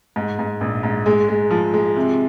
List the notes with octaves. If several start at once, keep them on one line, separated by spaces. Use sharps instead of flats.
G#2
G#2
A#1
G#2
G#3
G#3
F3
G#3
C3